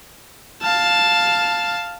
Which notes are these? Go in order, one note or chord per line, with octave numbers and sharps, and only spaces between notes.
F5 A5